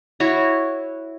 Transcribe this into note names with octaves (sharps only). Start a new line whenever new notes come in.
E4 F#4 C#5